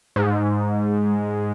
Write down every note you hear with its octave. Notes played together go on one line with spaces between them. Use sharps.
G#2